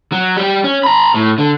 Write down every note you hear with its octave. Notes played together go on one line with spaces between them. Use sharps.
F#3
G3 G4
C#4
A#5 B5
A2
D3